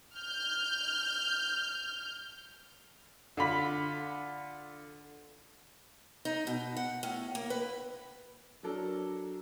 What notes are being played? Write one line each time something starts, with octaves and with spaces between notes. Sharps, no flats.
F6 G6
D3 F4 B5
D#4
B2
F#5
A2
A#3
B4
F#3 D4 A4 A#4